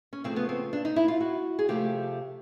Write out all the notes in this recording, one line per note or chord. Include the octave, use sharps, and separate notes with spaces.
C#4
C#3 F3 A3 C4
B3
C4
D4
D#4
E4
F4
F#4
G#4
C3 F3 A3 G4